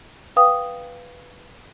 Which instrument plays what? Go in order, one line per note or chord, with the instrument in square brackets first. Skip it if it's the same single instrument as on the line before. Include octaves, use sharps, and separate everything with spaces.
[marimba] B4 F5 G5 D#6